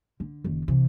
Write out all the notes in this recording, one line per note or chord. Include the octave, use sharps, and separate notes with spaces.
D3
F#1 D#3
C3 E3